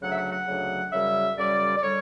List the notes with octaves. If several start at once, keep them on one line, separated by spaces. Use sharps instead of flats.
D2 C#3 F#3 F#5
E5
F#5
F#5
D2 C#3 F#3
F#2 C#3 G3 E5
F#2 C#3 G3 D5
D5
D3 G3 C#5